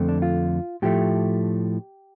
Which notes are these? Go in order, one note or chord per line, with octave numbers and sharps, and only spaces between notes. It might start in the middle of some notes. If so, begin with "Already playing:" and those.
Already playing: F2 D3 A3 C4
D4
F4
A2 F3 A3 G4